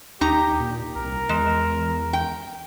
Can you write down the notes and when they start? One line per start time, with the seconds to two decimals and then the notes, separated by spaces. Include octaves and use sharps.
0.21 D#2 D#4 G4 A#5
0.60 A#2
0.96 C2 A#4
1.29 E2 G#3
2.13 G5